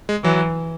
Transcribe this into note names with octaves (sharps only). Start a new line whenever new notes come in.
G#3
E3 F#3